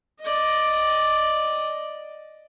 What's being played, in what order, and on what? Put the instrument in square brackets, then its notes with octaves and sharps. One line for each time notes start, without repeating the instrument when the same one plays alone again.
[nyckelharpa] D5 D#5